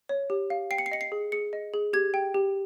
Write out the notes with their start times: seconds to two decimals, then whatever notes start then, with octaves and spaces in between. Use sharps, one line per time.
0.09 C#5
0.30 G4
0.50 F5
0.71 G5 C7
0.78 C#7
0.86 C7
0.92 D#5 C#7
1.01 C7
1.12 G#4
1.32 G#4 C#7
1.53 D#5
1.74 G#4
1.93 G4 G#6
2.14 G5
2.35 G4